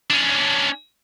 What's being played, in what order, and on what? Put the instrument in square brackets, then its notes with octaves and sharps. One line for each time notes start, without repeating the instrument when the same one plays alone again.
[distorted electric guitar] C#4 D4